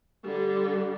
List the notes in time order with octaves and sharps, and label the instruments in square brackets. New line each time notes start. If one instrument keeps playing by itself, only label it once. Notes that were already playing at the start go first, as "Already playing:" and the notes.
[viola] D3 G3